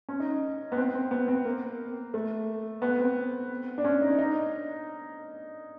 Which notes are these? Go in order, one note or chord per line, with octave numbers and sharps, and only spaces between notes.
C#4
D#4
B3
C4
C4
B3
C4
A#3
A3
B3
C4
D4
C#4
D#4
D4
D#4